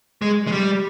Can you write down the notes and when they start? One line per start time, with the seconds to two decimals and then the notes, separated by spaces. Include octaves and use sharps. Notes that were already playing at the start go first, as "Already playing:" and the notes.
0.22 G#3
0.47 G#3
0.52 G3